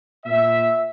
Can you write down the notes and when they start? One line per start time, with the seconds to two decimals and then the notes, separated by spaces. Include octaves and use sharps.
0.25 A#2 E5